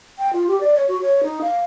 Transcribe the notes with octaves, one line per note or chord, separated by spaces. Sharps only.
G5
F4
G4
D5
C#5
F#4
C#5
D#4
F5